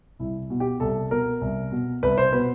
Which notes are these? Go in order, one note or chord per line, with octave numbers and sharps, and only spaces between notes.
C2 E4
B2
G4
C2 A4
B2 A#4
C2
B2
C2 B4
C5
B2 B4